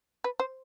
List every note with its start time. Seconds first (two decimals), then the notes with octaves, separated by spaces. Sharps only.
0.24 B4
0.40 C5